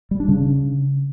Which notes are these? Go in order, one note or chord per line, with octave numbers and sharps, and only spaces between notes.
G3
D4
C#3